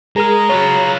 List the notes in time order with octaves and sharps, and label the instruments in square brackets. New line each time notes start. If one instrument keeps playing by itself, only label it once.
[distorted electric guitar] G#3 [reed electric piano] G#4 A#4 F6 [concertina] A#5
[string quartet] C#3 F#3 G#4 [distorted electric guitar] F4 B4 [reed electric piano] C#5